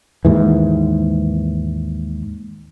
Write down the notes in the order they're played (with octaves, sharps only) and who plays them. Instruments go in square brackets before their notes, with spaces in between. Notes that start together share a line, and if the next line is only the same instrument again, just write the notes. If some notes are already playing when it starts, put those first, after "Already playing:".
[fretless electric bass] D#2 G#2 E3